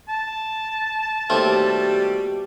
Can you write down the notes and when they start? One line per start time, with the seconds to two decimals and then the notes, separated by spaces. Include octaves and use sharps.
0.09 A5
1.30 D#2 B2 G3 A3 C4 G4